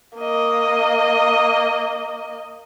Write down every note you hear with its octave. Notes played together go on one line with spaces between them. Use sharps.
A#3 D#5